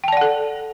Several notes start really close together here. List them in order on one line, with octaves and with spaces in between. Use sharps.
G5 A5 D5 F#5 A4